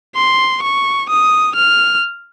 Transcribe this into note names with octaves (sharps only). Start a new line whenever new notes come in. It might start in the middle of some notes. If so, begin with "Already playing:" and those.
C6
C#6
D#6
F6